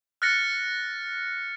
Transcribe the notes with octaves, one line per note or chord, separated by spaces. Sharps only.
F6 F#6 A6 A#6 C#7